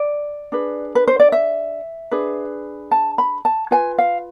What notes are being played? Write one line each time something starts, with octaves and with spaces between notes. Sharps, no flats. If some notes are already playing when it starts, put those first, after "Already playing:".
Already playing: D5
D4 G#4 B4
B4
C5
D5
E5
D4 G#4 B4
A5
B5
A5
F4 B4 G#5
F5